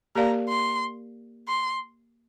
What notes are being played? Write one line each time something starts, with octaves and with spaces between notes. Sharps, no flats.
A#3 G4 A#4 D5 F5 A#5
C6
C6